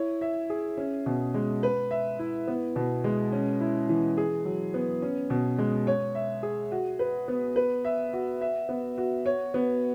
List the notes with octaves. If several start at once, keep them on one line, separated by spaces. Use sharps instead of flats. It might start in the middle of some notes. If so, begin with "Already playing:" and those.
Already playing: E4 C#5
E5
G#4
C#4
B2
G#3
B4
E5
E4
B3
B2
G#3
C#4
E4
E3
G#4
F#3
B3
C#4
B2
G#3
C#5
E5
G#4
F#4
B4
B3
B4
E5
F#4
E5
B3
F#4
C#5
B3